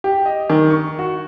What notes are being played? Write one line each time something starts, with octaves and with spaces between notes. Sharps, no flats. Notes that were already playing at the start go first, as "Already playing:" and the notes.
G4
D#5
D#3
C#6
F#4